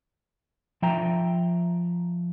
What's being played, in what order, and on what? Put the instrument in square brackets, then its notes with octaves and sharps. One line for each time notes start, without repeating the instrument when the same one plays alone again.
[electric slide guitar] F3 E5 G5 A#5